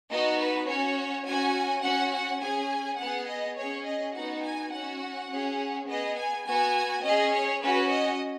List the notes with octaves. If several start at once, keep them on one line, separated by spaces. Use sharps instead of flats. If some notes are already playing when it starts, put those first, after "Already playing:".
B3 D#4 F#4 D#5
B4
C#4 F#4 C#5
C#4 F#4 G#5
C#4 F#4 F#5
F#5
C#4 G#4 G#5
B3 G#4 F#5
D#5
C#4 G#4 C#5
D#5
B3 D#4 F#4 F#5
G#5
C#4 F#5
F#4
C#4 G#4
B3 G#4 D#5
G#5
B3 F#4 G#5
C#4 G#4 D#5
C#5
C#4 F#4 B4
D#5